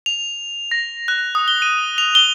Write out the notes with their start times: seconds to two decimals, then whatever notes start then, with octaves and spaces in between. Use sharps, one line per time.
0.06 F7
0.71 A#6
1.08 F#6
1.35 D#6
1.48 G7
1.62 D#7
1.98 F7
2.15 G7